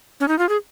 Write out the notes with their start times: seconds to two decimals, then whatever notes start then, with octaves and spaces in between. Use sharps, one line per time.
0.20 C#4
0.28 D#4
0.39 F4
0.49 G#4